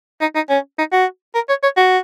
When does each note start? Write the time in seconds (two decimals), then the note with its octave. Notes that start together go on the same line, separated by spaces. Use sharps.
0.21 D#4
0.35 D#4
0.50 C#4
0.79 D#4
0.92 F#4
1.35 A#4
1.49 C#5
1.63 C#5
1.77 F#4